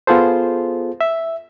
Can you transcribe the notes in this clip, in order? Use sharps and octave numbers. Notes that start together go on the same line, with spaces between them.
B3 F4 G#4 A4 C5
E5